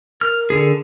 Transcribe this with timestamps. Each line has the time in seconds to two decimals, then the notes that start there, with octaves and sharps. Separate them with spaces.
0.21 A#4 F6
0.50 D3 G#4